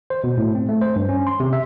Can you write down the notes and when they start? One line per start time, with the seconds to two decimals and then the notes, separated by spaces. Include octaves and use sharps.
0.10 C5
0.24 B2
0.37 A2
0.55 C4
0.69 A3
0.81 C5
0.96 G2
1.09 C#4
1.27 C6
1.40 C3
1.53 E5